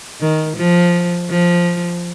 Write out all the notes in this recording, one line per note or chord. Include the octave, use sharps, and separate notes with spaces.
D#3
F3
F3